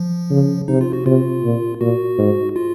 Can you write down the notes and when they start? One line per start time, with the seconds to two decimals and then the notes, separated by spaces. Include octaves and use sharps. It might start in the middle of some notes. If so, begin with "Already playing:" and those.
Already playing: F3
0.31 C#3
0.68 C3 D#4
0.81 F4
0.93 F#4
1.06 C3 F4
1.43 A#2
1.81 A#2 F#4
2.18 G#2
2.56 F4